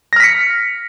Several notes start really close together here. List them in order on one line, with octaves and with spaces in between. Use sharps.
A#6 F6 B6 C#7